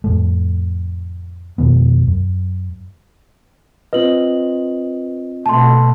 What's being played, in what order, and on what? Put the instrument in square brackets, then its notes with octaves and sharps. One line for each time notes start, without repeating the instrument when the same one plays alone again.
[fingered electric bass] F2 A2 A3
F2 B2 D#3 B3
F#2
[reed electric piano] C4 F4 D#5 [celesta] B4 F#7
[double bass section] B2 A3 [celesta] A5 C6